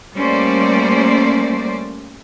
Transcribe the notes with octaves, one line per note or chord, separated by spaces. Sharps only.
G3 A3 A#3 C#4 C5 D5